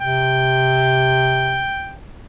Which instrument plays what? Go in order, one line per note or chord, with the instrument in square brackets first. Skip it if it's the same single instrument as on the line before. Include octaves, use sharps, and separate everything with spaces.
[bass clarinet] C3 [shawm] G5